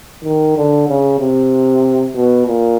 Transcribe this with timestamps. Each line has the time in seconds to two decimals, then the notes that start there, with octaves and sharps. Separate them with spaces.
0.24 D#3
0.57 D3
0.89 C#3
1.20 C3
2.15 B2
2.47 A#2